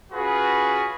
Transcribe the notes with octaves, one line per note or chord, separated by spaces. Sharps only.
C#4 F4 F#4 G#4 B4